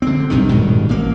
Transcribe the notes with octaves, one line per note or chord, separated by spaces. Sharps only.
D3 C4
B1 G2 C3 D#3
D#1 G#2 B2 D#3
A1 A#3